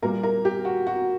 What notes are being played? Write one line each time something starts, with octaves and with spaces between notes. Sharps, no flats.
A#2 G3 A#3 A#4
A#4
G4
F#4
F#4